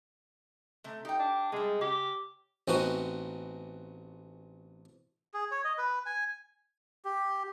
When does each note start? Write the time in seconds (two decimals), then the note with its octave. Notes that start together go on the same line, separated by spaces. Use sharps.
0.84 C3 A3
1.05 D#4 G4 G5
1.19 D4
1.52 C3 G3 G#3
1.81 C#3 G4
2.68 A1 B3 C4 D#4 F#4 D#6
5.34 G#4
5.51 C#5
5.64 D#5
5.78 B4
6.06 G#5
7.05 G4